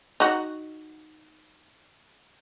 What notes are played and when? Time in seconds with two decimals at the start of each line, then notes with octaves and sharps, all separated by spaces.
0.20 D#4 F#4